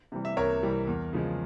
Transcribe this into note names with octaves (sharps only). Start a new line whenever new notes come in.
C3 E3 G3
E5
C2 A#4 C#5
C3 E3 G3
E2
C#3 F3 G#3